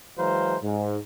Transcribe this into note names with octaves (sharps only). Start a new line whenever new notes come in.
E3 F#3 G#3 C5 F5 A#5
G#2